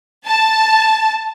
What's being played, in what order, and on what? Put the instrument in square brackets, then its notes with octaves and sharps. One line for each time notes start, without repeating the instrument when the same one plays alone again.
[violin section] A5